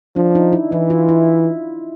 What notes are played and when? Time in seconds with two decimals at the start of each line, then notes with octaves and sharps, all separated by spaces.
0.16 F3 D4
0.35 D#4
0.53 E4
0.72 E3 E4
0.90 F4
1.09 E4